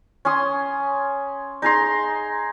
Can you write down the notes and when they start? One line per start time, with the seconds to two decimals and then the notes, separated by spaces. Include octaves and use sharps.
0.25 C#4 G#5 C6 D#6
1.62 D#4 G#4 A#5 C6